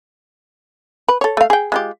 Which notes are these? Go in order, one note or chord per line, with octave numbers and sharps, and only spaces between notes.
B4
A4 C#5
A3 F5
G#4 G5
G#3 F4 G4